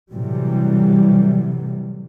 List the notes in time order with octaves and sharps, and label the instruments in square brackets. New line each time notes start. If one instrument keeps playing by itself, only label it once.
[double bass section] A2 C3 E3 F#3 G3